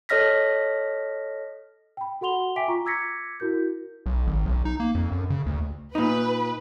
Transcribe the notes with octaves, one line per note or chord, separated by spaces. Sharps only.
A4 C#5 D#5 F6 A#6 B6
G5 B5
F#4 A4 F#5 C6 F7 G7
E5 G5 G#5 D6 B6 D7
F4 A#5 C#6
D6 E6 G#6 A#6 B6 C#7
E4 F#4 A#4 G6
B1
G#1
B1
D#4
A#3
F2
F#2
C#3
D2
A#2 D#4 B4